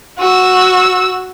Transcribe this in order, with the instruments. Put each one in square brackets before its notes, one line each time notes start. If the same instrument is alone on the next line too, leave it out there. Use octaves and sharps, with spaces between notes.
[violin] F#4 E6